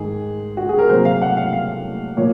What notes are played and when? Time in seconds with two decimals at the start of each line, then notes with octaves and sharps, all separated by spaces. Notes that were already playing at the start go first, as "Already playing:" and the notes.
Already playing: G#2 D#3 G#3 G#4
0.57 F#4
0.69 G#4
0.79 A#4
0.89 C3 F#3 A#3 C5
1.05 F5
1.22 F#5
1.37 F5
1.53 F5
2.17 A#2 F3 A#3 C#5